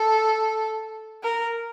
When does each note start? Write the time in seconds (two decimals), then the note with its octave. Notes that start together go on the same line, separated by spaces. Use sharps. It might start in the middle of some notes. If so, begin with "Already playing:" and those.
Already playing: A4
1.23 A#4